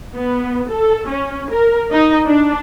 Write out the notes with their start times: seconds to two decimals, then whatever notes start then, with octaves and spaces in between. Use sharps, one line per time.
0.15 B3
0.70 A4
1.08 C#4
1.50 A#4
1.93 D#4
2.26 D4